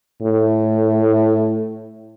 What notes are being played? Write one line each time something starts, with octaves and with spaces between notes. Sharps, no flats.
A2